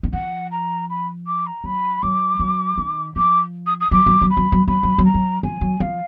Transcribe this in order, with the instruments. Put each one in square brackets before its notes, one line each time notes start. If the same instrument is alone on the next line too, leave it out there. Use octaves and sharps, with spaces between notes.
[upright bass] D#3
[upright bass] F3 [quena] F#5
[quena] A#5
B5
D6
A#5
[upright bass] F#3 [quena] B5
[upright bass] F#3 [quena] D6
[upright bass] F#3
D#3
[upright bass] F3 [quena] D6
[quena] D#6
D#6
[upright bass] F#3 [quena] D6
[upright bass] F#3
F#3
[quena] B5
[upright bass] F#3
F#3
[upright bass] F#3 [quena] B5
[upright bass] F#3
F#3
[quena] A#5
[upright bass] F#3
[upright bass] F3 [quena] G#5
[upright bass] F#3
[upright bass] F3 [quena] F5